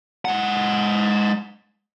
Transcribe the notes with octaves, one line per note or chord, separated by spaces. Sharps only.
G#3 F#5